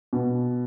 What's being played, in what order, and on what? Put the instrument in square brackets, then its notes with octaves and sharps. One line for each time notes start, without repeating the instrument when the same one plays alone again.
[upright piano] B2